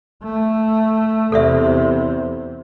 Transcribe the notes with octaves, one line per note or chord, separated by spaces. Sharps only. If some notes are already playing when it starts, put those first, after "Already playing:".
A3
E2 C3 A4 D5 E5